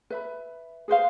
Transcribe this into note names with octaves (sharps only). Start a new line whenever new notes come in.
B4 E5 B5
G#4 B4 C5 F5